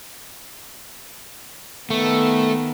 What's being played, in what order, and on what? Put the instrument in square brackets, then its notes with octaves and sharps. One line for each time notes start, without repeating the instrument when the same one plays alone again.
[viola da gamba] D#3 B3 [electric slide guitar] A3